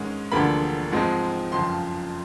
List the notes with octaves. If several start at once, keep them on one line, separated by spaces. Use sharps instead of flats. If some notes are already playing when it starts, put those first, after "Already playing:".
Already playing: G#2 D#3 G#3 C#4
E1 D2 D3 F3 A#3 B5
G#2 F3 G#3 C4 D#4
F#1 F2 C#3 F3 C6